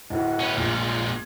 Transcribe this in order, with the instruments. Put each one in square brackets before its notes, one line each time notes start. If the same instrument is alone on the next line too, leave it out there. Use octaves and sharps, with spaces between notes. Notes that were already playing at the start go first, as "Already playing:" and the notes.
[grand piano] D1 A2 [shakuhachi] F#5
[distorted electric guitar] C#4 B4
[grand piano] A#1 [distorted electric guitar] A#2 G#3 [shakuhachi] F4